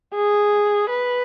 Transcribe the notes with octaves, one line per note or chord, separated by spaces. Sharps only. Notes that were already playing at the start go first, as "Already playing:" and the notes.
G#4
B4